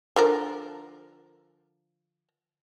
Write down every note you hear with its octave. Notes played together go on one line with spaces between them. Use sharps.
D3 F3 A#4